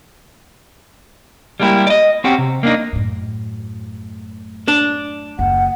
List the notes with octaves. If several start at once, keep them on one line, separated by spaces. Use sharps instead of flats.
G3 G#3 A#3 B3 E4 G4
D5 D#5
C4 C#4 F#4 G4
C3
A#3 D4 D#4
F#2 A2
D4
F#1 D#2 F#5